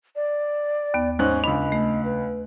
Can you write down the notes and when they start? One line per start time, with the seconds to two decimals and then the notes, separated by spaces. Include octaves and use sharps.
0.16 D5
0.94 D#2 B3
1.19 G#2 C#4 C5 F#6
1.44 C#2 D4 D#5 B5
1.72 A3
2.05 B4